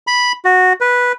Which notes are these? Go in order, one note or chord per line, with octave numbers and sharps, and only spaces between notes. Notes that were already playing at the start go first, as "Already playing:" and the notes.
B5
F#4
B4